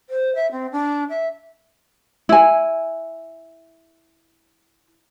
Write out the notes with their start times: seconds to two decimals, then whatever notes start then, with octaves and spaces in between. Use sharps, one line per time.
0.10 C5
0.35 E5
0.52 C4
0.72 D4
1.09 E5
2.29 E4 G#5